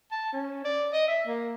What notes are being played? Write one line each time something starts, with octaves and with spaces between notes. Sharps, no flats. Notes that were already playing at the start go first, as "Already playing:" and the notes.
A5
C#4
D5
D#5
E5
A#3